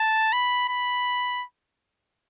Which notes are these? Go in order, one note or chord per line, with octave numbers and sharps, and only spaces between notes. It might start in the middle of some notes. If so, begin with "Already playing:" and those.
Already playing: A5
B5
B5